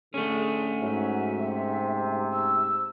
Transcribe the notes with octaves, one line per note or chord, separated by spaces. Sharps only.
D3 A3 C#4 G#4
G#2 F#3 E5
C3
E6